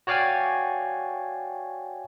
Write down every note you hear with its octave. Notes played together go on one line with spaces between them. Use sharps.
F#4 C#5 D5 F5 G5 G#5